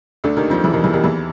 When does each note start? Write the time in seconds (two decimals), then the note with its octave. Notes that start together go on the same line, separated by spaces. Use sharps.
0.24 D2 D3
0.37 D#2 D#3
0.50 F2 F3
0.64 E2 E3
0.73 D#2 D#3
0.84 E2 E3
0.93 D#2 D#3
1.04 E2 E3